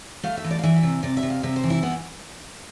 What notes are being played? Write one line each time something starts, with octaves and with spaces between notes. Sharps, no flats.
A3 F5
E5
E3
D5
F5
E3 E5
E5
C3
C3 D5
E5
C3
F5
C3 E5
C5
E3
E4
B3 E4